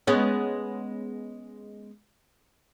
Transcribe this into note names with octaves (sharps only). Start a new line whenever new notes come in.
G#3 B3 C#4